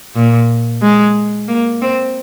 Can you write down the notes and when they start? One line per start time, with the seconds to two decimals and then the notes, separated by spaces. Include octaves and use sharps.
0.16 A#2
0.82 G#3
1.48 A#3
1.82 C4